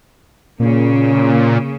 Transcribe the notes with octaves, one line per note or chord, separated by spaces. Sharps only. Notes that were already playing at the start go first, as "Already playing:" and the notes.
A#2 C#3 A#3